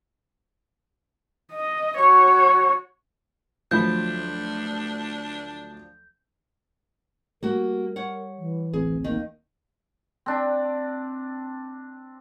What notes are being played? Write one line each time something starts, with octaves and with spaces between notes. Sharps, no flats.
D#5
F#4 C#5 C#6
D2 F3 F#3 D4 B5 G6
G3 A#3 F#4 A#4
C#5 F#5
E3
D1 A1 C4 G#4
D#3 A#3
C4 D4